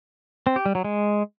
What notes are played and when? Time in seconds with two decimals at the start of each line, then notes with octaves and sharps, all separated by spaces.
0.47 C4
0.56 G4
0.66 G3
0.75 F#3
0.85 G#3